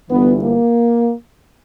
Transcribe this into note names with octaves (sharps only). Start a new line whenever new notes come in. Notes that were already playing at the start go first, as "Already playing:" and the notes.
G1 G2 E3 B3
A#3